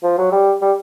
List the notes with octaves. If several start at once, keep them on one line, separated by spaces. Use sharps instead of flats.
F3
F#3
G3
G3